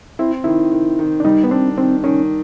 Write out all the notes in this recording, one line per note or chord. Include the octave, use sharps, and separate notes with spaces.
C4 E4
D#3 E4
D#3
D#3
D4
G3 D#4
B3
C4 D4
D#3 C4
D#3 C#4